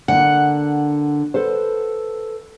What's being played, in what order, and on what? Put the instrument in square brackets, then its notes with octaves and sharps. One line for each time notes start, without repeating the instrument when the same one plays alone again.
[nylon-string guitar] D3 A#3 [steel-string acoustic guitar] F#5
[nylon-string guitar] A4 B4 C5